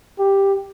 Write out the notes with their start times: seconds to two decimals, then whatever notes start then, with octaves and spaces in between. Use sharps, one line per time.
0.19 G4